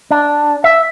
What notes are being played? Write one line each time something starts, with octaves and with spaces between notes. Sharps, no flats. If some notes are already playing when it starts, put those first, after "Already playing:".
D4
E5